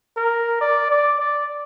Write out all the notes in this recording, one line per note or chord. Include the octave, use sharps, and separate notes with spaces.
A#4
D5
D5
D5